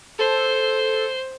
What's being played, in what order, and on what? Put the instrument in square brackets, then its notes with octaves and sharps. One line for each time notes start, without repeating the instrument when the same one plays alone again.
[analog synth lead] A4 [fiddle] C5